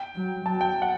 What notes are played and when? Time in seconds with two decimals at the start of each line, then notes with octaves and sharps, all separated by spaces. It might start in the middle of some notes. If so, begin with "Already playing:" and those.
Already playing: G5
0.15 F#3
0.46 F#3 A5
0.61 G5
0.82 F#5